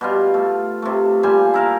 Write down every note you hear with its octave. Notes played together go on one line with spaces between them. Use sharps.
B2 G3 F4
A3
C3 A3
A#2 G3 C5 G#5
E4 A#4 F5